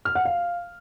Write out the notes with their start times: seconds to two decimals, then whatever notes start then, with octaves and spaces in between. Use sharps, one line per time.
0.05 F6
0.15 F#5
0.25 F5